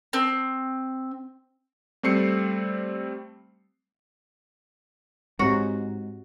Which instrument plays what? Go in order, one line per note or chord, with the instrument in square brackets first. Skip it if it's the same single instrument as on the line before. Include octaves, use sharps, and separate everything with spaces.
[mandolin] C4
[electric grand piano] G3 A3 C4 C7 C#7
[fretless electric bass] G#2 [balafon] C4 G4 C#5 [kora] F#4